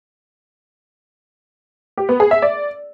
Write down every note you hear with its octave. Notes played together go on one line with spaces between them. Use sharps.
G4
B3
G#4
E5
D5